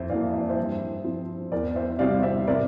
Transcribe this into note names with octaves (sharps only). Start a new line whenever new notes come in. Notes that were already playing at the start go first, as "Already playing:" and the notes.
Already playing: F2 C5 E5
E3 A#3 D5 F5
E5
D5
C5 E5
G2
F3 C4
E2 A#4 D5
C5 E5
C3 G3 C4 D5 F5
C5 E5
C3 A#4 D5